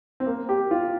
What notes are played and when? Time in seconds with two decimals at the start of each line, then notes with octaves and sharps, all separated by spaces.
0.20 C4
0.26 A#3
0.49 G4
0.71 F4